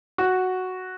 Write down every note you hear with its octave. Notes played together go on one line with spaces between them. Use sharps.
F#4